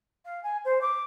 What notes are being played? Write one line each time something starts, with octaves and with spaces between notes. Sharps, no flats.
F5
G#5
C5
D6